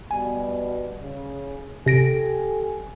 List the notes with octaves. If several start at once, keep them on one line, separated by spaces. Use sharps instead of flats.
B2 G3 G#5
C#3
C3 G4 A4 G#5 A#6 D7